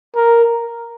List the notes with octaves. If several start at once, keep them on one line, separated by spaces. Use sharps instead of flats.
A#4